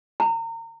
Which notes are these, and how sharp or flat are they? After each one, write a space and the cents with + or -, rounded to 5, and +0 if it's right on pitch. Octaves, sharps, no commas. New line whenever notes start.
A#5 -30